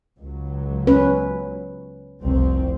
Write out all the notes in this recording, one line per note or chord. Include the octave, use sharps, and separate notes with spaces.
C#2 F#3
C#4 B4
F1 C2 C4